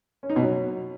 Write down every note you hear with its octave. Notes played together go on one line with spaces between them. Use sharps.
C#4
D#4
B2
F#3